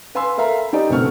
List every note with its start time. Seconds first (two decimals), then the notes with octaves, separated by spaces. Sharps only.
0.15 B4 F5 G#5 B5 C6 E6
0.38 A4 A#4 E5 F5 A#5 B5
0.73 D#4 G4 D5 D#5
0.90 F#1 B2 A3 C4 C#6 F6